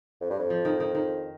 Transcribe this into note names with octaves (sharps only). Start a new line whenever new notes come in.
F2
G2
F2
F3
D#3
D#3
D#3